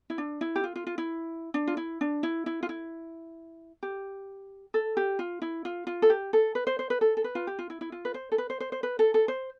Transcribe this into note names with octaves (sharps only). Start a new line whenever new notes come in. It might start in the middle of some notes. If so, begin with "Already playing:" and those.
E4
D4
E4
G4
F4
F4
F4
E4
D4
F4
E4
D4
E4
E4
F4
E4
G4
A4
G4
F4
E4
F4
F4
A4
G4
A4
B4
C5
C5
B4
A4
A4
B4
F4
G4
F4
E4
E4
F4
B4
C5
A4
B4
C5
C5
C5
B4
A4
A4
C5